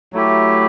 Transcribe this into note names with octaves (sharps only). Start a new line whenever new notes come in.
F#3 A3 E4 G4